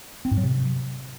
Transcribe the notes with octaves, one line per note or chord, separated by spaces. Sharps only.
C4
G#2
F#3
C3